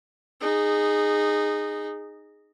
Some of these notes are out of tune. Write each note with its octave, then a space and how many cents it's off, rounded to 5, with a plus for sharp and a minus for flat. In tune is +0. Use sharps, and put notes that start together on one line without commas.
D#4 -15 G#4 -5